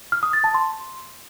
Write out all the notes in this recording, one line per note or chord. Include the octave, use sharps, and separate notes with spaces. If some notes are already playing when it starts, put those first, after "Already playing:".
F6
D#6
A6
A5
C6